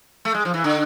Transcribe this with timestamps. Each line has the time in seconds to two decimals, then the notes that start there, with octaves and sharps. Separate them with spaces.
0.25 A3
0.34 G#3
0.45 F3
0.54 E3
0.64 D3